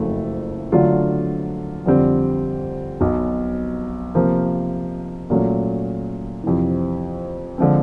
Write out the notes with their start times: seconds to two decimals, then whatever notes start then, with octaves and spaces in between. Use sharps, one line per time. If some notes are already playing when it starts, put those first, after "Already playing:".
Already playing: F#1 F2 C#3 F#3 A3
0.72 D3 F#3 A3 D4 F4
1.86 F2 D3 G3 C4
3.00 B1 B2 F#3
4.15 C3 F3 A#3
5.30 A#2 F#3 A3 C#4
6.43 F2 C3 E3
7.58 D3 F3 G#3 C4